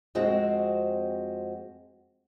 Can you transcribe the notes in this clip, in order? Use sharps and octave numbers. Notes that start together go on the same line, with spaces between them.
F2 G#3 C4 F#4 C5